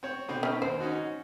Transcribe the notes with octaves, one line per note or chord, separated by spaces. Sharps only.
C4 C#5
B2 D3 C4
C#4 D#4
D#2 C5
C#4 D#4 F#4